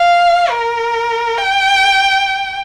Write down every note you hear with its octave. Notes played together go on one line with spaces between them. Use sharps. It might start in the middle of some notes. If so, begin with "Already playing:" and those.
Already playing: F5
A#4
G5